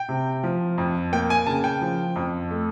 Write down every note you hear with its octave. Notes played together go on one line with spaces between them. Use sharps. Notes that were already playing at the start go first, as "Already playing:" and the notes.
Already playing: G5
C3
F3
F2
A#3 G5
G#5
C#3 A5
G5
F3
F2
A3